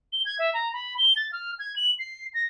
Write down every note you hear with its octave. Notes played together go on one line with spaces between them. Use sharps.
G7
G#6
E5
A#5
B5
G7
A6
F6
G#6
F#7
C7
A#6